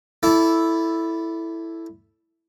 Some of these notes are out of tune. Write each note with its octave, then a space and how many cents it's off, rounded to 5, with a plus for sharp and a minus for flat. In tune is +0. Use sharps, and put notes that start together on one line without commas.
E4 +0 A4 +0 D5 -20